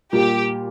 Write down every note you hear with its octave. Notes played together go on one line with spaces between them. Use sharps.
A#2 G3 A#3 F4 G4